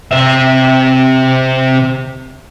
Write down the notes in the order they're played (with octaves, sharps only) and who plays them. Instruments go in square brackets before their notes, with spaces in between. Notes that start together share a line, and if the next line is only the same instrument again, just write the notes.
[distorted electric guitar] C3 E5